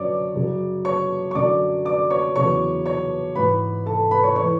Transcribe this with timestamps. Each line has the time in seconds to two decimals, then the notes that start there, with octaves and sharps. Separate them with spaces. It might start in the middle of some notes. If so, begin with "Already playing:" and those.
Already playing: F#2 D3 F#3 C#5 D5 D6
0.35 F#2 C#3 F#3
0.85 C#5 C#6
1.31 C#6
1.35 F#2 D3 F#3 D5 D6
1.85 D5 D6
2.10 C#5 C#6
2.36 E2 C#3 F#3 C#5 C#6
2.86 C#5 C#6
3.36 G#2 E3 B4 B5
3.86 A4 A5
4.11 B4 B5
4.23 C#5 C#6
4.36 E3 C#5 C#6